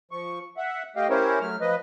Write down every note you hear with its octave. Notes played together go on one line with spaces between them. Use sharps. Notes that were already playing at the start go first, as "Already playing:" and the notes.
F3 C#6
E5 F#5
A3 G4 D#5 F5 G5
C#4 E4 G4 A#4 C5 C#5
F#3 A3 F6
F3 B4 D#5